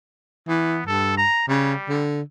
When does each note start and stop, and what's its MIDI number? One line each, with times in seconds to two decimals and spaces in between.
0.49 0.82 52
0.49 0.84 59
0.87 1.25 43
0.87 1.13 69
1.17 1.44 82
1.49 1.75 49
1.49 2.05 55
1.89 2.22 50